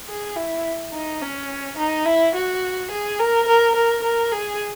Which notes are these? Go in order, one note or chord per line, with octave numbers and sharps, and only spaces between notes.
G#4
E4
D#4
C#4
D#4
E4
F#4
G#4
A#4
A#4
A#4
A#4
G#4